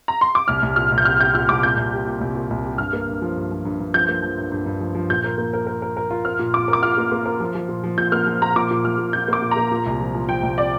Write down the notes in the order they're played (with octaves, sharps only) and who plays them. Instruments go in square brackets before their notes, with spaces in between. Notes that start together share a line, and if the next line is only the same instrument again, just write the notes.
[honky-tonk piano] A#5
C6
D6
[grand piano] C2 [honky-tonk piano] F6
[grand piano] C2
[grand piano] A#2 [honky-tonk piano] F6
[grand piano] C2
[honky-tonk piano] G6
[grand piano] G4 [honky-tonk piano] F6
[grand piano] G4 [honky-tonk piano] G6
[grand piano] A#2 [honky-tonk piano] F6
[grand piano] C2 [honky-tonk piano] D6
[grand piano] A#2 [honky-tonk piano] G6
[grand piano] C2
G4
A#2
C2
A#2
C2
G4
[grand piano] G2 [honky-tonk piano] F6
[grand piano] A#3
G2
F3
G2
F3
G2
G2
[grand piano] F3 [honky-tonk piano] G6
[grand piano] A#3
F3
G2
G2
G2
F3
F3
[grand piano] A#2 [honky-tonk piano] G6
[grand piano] A#4
A#3
A#4
A#4
A#4
A#4
F4
[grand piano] A#4 [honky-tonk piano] F6
[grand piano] A#2
[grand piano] F4 [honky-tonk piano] D6
[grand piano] A#4
[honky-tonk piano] D6
[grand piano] F4 [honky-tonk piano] F6
[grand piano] A#3
A#3
A#4
F3
F3
A#2
F3
[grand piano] A#2 [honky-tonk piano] G6
[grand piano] A#3 [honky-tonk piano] F6
[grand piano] F3
[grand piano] A#2 [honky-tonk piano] A#5
[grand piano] A#2 [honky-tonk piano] D6
[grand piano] A#2
[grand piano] F3 [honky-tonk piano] F6
[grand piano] A#2
[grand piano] F3 [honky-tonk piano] G6
[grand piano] A#3 [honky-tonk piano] D6
[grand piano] A#2
[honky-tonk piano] A#5
[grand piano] A#3
A#2
C2
F3
F3
[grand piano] F3 [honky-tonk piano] G5
[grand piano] C2
[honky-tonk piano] D5